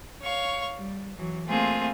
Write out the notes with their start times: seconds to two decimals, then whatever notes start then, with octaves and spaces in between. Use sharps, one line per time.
0.23 C#5 F5 C#6
0.77 G3
1.16 E3 F#3
1.47 A3 A#3 C4 F4 G#4